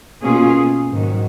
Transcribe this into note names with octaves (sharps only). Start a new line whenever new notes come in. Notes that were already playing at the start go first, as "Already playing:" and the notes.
B2 A#3 C#4 F4 G#4
G#2 D#3 F#3